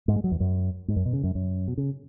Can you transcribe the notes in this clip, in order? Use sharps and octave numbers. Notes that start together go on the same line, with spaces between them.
G#2
G#3
F#3
E2
F#2
G#2
F#2
B2
C#3
F#2
F#2
B2
C#3